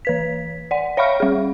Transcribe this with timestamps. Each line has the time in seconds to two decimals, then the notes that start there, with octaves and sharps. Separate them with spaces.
0.05 E3 B4 B6
0.71 D5 F#5
0.97 C#5 E5 F5 B5 C#6 F6
1.20 G3 G#4